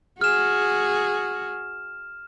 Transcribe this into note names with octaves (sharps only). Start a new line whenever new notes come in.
F#4 G#4 F6 E7